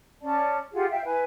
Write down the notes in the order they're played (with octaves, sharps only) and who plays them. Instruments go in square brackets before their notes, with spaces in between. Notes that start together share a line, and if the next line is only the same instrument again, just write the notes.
[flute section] C#4 D5 A5
F4 G4 G#4 F#5
E5 F5 G5
E4 B4 G#5